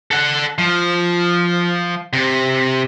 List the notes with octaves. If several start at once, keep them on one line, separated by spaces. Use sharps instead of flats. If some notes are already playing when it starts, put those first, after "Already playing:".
A4 F#5
F3
C3